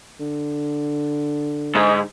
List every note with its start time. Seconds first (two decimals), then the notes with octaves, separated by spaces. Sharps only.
0.20 D3
1.75 G#2